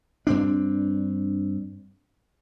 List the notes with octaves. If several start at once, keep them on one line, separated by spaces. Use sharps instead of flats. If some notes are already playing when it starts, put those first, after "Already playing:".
G2 C4 D4